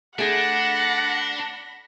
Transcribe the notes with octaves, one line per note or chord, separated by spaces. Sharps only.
A3 D4 G#4 F#5 B5 A#6